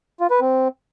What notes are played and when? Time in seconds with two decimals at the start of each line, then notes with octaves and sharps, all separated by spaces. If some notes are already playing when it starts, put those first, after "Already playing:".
0.20 F4
0.31 B4
0.41 C4